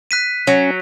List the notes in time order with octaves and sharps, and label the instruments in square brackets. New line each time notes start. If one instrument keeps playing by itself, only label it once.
[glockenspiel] F#6 B6 D#7
[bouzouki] F#3 [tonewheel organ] C#4